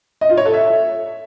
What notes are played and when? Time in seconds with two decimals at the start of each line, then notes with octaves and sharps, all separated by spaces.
0.21 D#5
0.29 F4
0.37 C#5
0.46 A4
0.54 E5